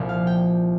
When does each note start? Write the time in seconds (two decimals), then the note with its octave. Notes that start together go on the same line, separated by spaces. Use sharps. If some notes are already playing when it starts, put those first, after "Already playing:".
Already playing: C2 A#2 F3
0.09 F5
0.27 G5